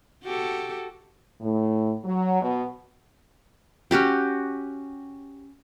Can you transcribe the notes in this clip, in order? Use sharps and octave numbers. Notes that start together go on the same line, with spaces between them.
F#4 G4 A4
A2
F#3
B2
C#4 F#4 G4 G5